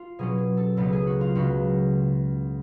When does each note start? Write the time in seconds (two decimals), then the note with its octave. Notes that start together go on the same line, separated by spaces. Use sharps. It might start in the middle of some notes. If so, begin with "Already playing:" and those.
Already playing: F4
0.19 B2 F#3 C#4 G#4
0.38 G#4
0.57 A4
0.77 C#2 C#3 F#3 B3 A4
0.93 G#4
1.07 F#4
1.21 F4
1.35 C#2 C#3 F#3 B3 F#4